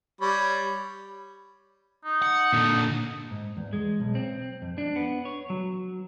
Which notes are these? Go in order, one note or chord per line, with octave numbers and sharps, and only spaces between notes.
G3 C#5 B5
D#4
F#5
A#2 D3
G#2
E2
G#3
B1
C4
F2
D4
B3
C#5
F#3